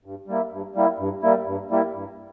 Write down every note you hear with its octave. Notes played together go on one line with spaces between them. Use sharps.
G2
G3 A#3 E4
G2
G3 A#3 E4
G2
G3 A#3 E4
G2
G3 A#3 E4
G2